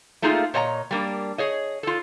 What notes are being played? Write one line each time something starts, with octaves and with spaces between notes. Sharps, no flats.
A3 A#3 D#4 F4 G#4
A#2 C#5 D#5 G#5 A#5
G3 A#3 D4
G#4 C#5 D#5
F4 A4